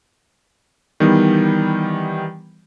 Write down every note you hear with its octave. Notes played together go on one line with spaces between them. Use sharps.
D#3 E3 G3 B3 D#4